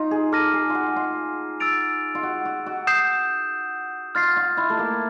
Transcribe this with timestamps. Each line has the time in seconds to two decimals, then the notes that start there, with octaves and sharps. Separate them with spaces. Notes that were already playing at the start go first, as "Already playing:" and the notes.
Already playing: D#4 F4
0.11 G#4
0.32 A4 D6 F6 A#6 D#7
0.53 G#4
0.70 F4 F#4
0.96 F4
1.60 E6 A6 D7 F7
2.15 F4
2.23 F#4
2.45 F#4
2.66 F#4
2.87 D#6 G6 C7 E7
4.15 F4 F6 A6 C7
4.37 F4
4.57 E4
4.70 A3
4.79 A#3